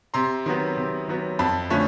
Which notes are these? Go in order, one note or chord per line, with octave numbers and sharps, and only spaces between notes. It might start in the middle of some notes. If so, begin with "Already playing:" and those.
C3 A#5 C6
D#3 F#3 B3
C3
D#3 F#3 B3
F2 A5 B5
D3 F3 A3 C#4